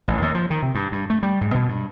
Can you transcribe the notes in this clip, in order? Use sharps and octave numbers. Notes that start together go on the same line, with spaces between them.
A1
D#2
F3
D#3
C3
G2
G2
A3
G3
G#2
B2
G2